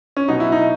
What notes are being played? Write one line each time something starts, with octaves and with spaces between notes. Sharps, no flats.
C#4
B2 F#3 D#4
E4
D#4